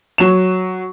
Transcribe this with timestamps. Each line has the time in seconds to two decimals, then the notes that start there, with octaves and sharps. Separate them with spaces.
0.18 F#3 E7